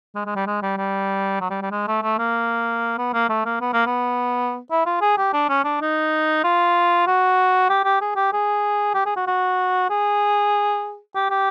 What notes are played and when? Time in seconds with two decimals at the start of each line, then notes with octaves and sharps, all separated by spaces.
0.15 G#3
0.26 G#3
0.36 G3
0.47 G#3
0.62 G3
0.77 G3
1.41 F#3
1.50 G3
1.62 G3
1.71 G#3
1.87 A3
2.03 A3
2.18 A#3
2.98 B3
3.14 A#3
3.29 A3
3.45 A#3
3.61 B3
3.73 A#3
3.86 B3
4.71 E4
4.86 F4
5.01 G#4
5.17 G4
5.33 D4
5.49 C#4
5.64 D4
5.81 D#4
6.44 F4
7.07 F#4
7.70 G4
7.84 G4
8.01 G#4
8.16 G4
8.33 G#4
8.94 G4
9.06 G#4
9.16 F#4
9.27 F#4
9.90 G#4
11.15 G4
11.31 G4